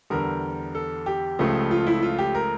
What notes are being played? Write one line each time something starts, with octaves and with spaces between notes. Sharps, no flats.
E2 D3 G3 A#4
A4
G4
C#2 C#3 F3 A3
F4
E4
F4
G4
A#4